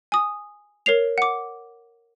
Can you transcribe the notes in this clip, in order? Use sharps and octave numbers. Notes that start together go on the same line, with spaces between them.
G#5 D#6
A#4 C#5 C7 F7
F#5 D6